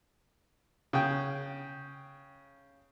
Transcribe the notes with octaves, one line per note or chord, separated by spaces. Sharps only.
C#3 G5